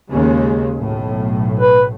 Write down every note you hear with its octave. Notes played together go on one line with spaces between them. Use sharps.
D#2 C#3 G#3
B1 A2
B4